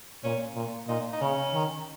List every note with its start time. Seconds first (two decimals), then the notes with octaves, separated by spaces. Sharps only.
0.24 A#2 C#4
0.55 A#2
0.88 A#2 D#4
1.13 D#4
1.21 C#3 C#4
1.54 D#3